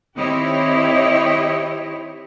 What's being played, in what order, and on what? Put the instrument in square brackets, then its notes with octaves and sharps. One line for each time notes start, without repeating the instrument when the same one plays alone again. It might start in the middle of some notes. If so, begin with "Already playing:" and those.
[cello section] D#3 C4 E4 G4 C#5 D#5